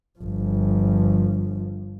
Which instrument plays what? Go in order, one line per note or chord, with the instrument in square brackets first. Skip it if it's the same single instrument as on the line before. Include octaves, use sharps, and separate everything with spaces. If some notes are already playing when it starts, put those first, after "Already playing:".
[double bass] G1 F3